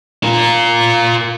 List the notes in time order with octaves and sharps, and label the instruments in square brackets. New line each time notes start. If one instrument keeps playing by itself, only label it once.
[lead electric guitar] F4 A#4